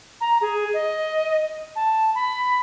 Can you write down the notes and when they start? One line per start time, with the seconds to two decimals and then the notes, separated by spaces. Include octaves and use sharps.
0.21 A#5
0.41 G#4
0.74 D#5
1.76 A5
2.15 B5